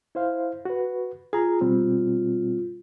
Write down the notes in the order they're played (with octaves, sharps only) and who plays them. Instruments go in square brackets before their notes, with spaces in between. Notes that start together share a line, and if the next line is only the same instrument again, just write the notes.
[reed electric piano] E4 C5 F5
F#4 B4
[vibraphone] F4 [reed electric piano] G#4 A#5
[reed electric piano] B2 G3 C4